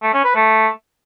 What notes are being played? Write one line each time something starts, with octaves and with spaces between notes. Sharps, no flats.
A3
C#4
B4
A3